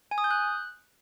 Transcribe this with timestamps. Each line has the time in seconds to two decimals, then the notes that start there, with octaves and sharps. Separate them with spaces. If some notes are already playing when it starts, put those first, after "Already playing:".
0.11 G#5
0.18 D#6
0.24 G6
0.31 F#6